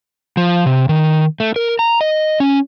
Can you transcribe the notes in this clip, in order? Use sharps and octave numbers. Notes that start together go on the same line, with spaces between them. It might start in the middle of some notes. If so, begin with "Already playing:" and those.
F3
C3
D#3
A3
A#4
A#5
D#5
C#4